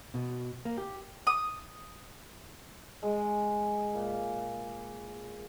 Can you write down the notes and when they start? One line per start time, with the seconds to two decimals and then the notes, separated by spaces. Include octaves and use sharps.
0.14 B2
0.65 A#3
0.78 G4
1.27 D#6
3.03 G#3
3.94 A#2